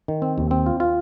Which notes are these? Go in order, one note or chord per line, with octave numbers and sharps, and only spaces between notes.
D#3
C4
D#2
C4
F4
F4